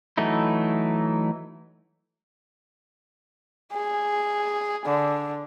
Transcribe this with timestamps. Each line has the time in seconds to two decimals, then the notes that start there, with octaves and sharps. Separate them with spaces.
0.18 E3 F#3 A3 D#4 E4
3.74 G#4
4.86 D3